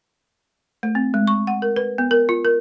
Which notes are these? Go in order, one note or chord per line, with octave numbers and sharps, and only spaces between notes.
A3
C4
G#3
C#6
F#5
A#4
B4
B3
A#4
F4
A#4